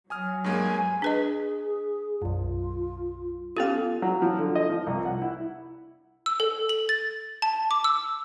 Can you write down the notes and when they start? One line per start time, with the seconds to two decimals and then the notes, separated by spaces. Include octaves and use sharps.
0.10 F#3 G#5 D#6 F6
0.44 G2 G#3 A#3 G#5
1.02 D4 G#4 B4 D#5
2.22 B1 F#2 F4
3.57 B3 C#4 F4 G4 A4 F5
4.02 F#3
4.22 F3
4.38 D3
4.55 D#5
4.69 F3
4.87 C2
5.05 F#5
5.22 E4
6.26 E6
6.40 A4
6.69 F#7
6.89 A6
7.42 A5
7.71 D6
7.84 E6